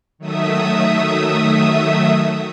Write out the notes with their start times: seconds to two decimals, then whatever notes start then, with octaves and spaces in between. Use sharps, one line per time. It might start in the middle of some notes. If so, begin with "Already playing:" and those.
0.18 D#3 F#3 A3 E5 D#6